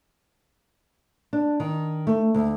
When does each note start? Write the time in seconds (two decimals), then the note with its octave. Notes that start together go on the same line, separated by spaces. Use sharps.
1.33 D4
1.60 D#3
2.07 A3
2.35 D2